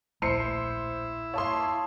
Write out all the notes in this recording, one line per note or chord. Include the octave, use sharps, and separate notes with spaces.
D1 A#1 A3 E4 C5 C7 C#7
C#5 F5 A5 C6 D#6